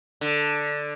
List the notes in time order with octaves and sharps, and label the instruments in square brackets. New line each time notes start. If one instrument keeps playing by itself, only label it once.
[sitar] D3